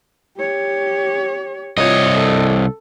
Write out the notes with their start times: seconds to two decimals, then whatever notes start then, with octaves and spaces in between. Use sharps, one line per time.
0.37 G4 C#5
1.77 C2 F4 C#5 D#5
2.14 A4